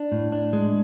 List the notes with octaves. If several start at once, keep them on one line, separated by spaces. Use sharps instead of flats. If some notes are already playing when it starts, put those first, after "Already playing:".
Already playing: D4
A2
D4
G#3